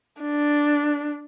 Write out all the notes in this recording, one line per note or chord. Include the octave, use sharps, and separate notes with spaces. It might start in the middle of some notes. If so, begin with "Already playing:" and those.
D4